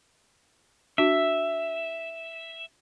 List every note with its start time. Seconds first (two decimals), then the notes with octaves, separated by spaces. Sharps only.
0.98 D4 F#4 E5